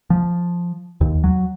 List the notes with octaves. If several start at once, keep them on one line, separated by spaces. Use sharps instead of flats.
F3
D#2
F#3